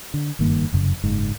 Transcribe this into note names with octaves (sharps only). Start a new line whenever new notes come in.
D3
F#1 G2 D#3 A#3
F1 F#2 C#3
F#1 G#2